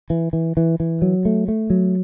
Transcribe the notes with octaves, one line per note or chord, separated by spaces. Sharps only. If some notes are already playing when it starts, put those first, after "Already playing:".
E3
E3
E3
E3
F#3
A3
A3
F#3